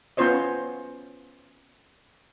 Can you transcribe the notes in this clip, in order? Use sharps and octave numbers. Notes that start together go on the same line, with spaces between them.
B3 C#4 F4 C5 C#5 D#5